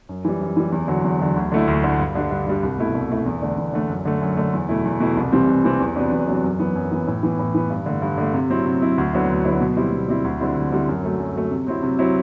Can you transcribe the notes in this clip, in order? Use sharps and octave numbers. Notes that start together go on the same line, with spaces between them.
F#2
E3 G3
F#2
E3 G3
E2
D3 F#3
E2
D3 F#3
D2
D3 A3 E4
D2
D3 A3 E4
G2
D3 G3 D4
G2
D3 G3 D4
C2
B2 A3 E4
C2
B2 A3 E4
E2
D3 A3 D4
E2
D3 A3 D4
F#2
D3 A3
F#2
D3 A3
E2
B2 A3 E4
E2
B2 A3 E4
C2
C3 E3 G3 C4
C2
C3 E3 G3 C4
E2
C3 F#3 B3 D4
E2
C3 F#3 B3 D4
F#2
E3 B3
F#2
E3 B3
A2
E3 B3
A2
E3 B3
G2
D3 A3
G2
D3 A3
C3
F#3 C4 E4
C3
F#3 C4 E4
D2
D3 F#3 B3 E4
D2
D3 F#3 B3 E4
B2
G3 C4 E4
B2
G3 C4 E4
D2
D3 G3 C4 E4
D2
D3 G3 C4 E4
F#2
F#3 A3
F#2
F#3 A3
C3
F#3 C4 E4
C3
F#3 C4 E4